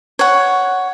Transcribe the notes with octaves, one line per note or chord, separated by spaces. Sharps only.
C#5 F#5